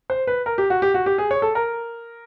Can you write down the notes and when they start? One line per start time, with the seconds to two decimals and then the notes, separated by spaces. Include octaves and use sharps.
0.10 C5
0.27 B4
0.46 A#4
0.58 G4
0.70 F#4
0.82 G4
0.94 F#4
1.06 G4
1.18 G#4
1.31 C#5
1.42 A4
1.55 A#4